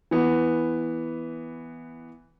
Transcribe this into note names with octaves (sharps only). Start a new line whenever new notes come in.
E3 B3